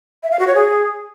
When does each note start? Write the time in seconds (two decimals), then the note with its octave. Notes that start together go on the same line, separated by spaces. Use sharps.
0.23 E5
0.31 F5
0.39 F#4
0.47 C#5
0.55 G#4